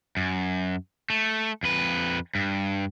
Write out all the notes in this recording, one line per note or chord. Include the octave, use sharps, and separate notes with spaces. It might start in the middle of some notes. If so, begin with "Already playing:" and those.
F#2
A3
F2 B4
G2